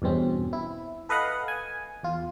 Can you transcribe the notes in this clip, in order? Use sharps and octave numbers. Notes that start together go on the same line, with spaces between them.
E2 G2 B2 C4 C#4
E4
A4 B4 D#5 F5 F#5
G#5
E2 F4